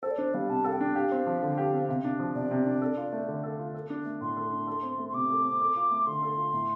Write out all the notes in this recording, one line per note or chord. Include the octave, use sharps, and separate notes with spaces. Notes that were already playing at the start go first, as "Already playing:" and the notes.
A4 C5
D5
D4 C5
G3 F5
C3 A5
A4 F5
G5
D4
G4 F5
C4
F3
D3
G4
C4
C3 F5
D4
F3
C3 D5
C3
D4
A4
F4
A3
D3
A4
F4
A4
D4
A3
A2 C6
A4
D4
A4
C4
A3
C6
C3 D6
A4
C4
A4
F4
A3
D3 C6
A4
F4
A2